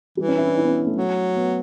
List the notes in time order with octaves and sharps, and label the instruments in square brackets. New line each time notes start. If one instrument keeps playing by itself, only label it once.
[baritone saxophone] E3 [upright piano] G3
[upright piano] C#4
E4
D4
E4
B3
C#4
A3
[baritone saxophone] F#3
[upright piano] B3